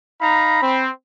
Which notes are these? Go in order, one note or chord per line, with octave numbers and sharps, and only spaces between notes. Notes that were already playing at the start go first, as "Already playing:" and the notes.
D#4 F5 A#5 B5
C4